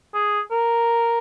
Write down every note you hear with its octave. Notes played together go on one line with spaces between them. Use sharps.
G#4
A#4